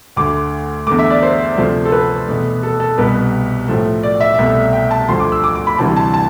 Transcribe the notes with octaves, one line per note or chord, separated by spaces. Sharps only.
D2 D3 A3 D6
E2 D3 A3 D6
E5
D5
C5
D2 C3 F3 A3
A4
B4
E2 B2 A3
A4
A4
C2 B2 G3 B4
A2 F3 A3
D5
E5
C2 B2 A3
G5
A5
D2 D3 F3 A3 C6
D6
E6
D6
D6
B5
D2 C3 E3 G3 A5
A5
A5